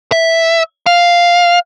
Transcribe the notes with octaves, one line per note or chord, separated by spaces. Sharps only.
E5
F5